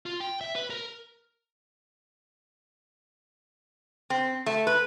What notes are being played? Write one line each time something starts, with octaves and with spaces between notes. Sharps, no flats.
F4
G5
E5
B4
A#4
C4
A3
B4